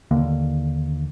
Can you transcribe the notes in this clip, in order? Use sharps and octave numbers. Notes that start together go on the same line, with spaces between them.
D#2 D3 D#3 A#3